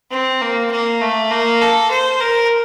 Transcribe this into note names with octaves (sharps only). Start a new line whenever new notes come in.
C4
A#3
A#3
A3
A#3
A4
C5
A#4